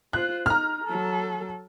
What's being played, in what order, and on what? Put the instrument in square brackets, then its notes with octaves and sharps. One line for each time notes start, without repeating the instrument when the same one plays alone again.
[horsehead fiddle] F4 C5 [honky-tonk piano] F#6
[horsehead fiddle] D#4 [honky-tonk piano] A#5 F6
[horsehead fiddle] F#3 A4